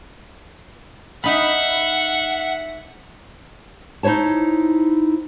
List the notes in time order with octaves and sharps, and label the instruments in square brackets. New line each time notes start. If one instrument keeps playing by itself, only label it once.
[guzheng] D#4 B5 [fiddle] E5 F#5
[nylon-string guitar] D#4 E4 C5 C#5 A5